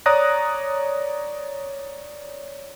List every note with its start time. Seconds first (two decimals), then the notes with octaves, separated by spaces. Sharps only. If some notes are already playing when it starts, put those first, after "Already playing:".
0.06 C#5 D5 A#5 D#6 F#6 A#6